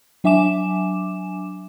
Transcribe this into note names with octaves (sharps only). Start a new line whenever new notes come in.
F#3 D4 E5 G#5 D6 E7